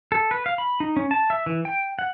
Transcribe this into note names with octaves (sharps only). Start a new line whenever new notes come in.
A4
B4
F5
B5
D#4
C#4
A5
E5
E3
G5
F#5